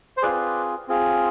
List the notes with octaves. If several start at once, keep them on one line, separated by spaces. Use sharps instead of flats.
C5
C4 F4 G#4 B4 D5
C4 F4 G#4